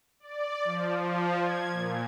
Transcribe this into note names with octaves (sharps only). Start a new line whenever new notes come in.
D5
F3
F3
G#6
A#2